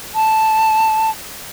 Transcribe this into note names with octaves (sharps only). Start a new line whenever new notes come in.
A5